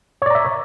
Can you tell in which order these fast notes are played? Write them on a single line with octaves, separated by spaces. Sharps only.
C#5 D5 A#5 E5